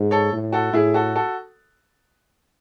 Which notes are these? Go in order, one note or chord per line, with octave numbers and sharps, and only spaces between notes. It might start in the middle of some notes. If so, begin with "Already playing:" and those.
Already playing: G#2
A4 C#5
A2
F#4 A4
A2 E4 G#4
F#4 A4
F#4 A4